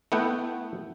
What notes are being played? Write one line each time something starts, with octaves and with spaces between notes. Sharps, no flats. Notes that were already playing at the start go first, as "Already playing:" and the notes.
A3 B3 E4 F#5 G5